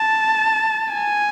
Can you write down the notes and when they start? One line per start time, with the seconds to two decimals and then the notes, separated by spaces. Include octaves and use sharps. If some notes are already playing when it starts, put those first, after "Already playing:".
Already playing: A5
0.93 G#5